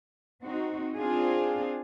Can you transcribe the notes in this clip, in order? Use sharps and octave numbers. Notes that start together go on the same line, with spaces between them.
C4 D#4 F#4
C4 D4 F4 G#4